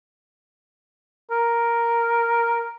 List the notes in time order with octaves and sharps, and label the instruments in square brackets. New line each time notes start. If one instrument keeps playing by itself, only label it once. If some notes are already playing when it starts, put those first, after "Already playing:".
[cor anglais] A#4